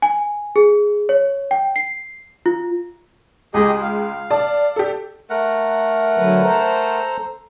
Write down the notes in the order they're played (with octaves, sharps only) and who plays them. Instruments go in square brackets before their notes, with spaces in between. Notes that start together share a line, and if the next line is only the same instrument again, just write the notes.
[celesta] G#5
G#4
C#5
G5
C7
F4
[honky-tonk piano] C#2 G#3 [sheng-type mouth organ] G4 G#4 D#5
[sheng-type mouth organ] F5
[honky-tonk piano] D5 A5
G4 A4
[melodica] A3 A#4 F#5
[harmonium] D3 F#3 B4
A4 C5 A#5